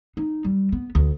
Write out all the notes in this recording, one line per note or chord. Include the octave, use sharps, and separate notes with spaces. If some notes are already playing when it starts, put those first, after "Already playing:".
D#4
G3
B3
D2